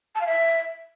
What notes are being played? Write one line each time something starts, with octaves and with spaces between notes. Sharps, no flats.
A5
F5
E5